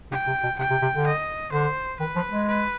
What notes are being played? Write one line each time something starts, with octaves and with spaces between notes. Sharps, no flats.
C3 G5
C3
B2
C3 G5
C3
C3
D3
D#5
D3 C5
D#3 B4
F3
G#3
B4